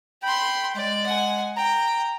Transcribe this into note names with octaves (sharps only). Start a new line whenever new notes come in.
G5 B5 C6
G#3 D5
F#5 G#5
G5 A#5